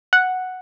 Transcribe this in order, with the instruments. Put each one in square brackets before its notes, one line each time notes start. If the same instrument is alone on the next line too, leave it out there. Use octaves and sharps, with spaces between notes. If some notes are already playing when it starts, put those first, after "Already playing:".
[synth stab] F#5